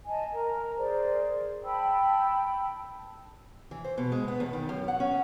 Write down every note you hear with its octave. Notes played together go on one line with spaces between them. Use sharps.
D#5 G#5 A5
A#4 A#5
G#4 A#4 C5 D5
G5 A5 B5 E6
E3
C5
B2
G#3
B3
E2
D#3
F#2
F#5
C#4